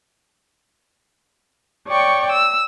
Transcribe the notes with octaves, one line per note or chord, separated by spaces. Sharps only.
C#5 D5 G5 C#6
E6